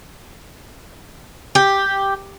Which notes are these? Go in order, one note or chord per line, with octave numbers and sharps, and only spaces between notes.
G4